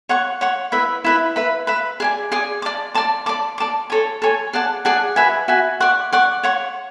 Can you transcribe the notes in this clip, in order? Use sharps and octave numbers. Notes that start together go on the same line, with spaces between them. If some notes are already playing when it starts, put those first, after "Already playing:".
C#5 F#5 C#6
C#5 F#5 C#6
E4 B4 E5
E4 B4 E5
B4 E5 B5
B4 E5 B5
G#4 D5 G#5
G#4 D5 G#5
D5 A5 D6
D5 A5 D6
D5 A5 D6
D5 A5 D6
A4 C#5 G#5
A4 C#5 G#5
G#4 D5 F#5 A5
G#4 D5 F#5 A5
F#4 B4 E5 G#5
F#4 B4 E5 G#5
D5 F#5 C#6
D5 F#5 C#6
C#5 F#5 C#6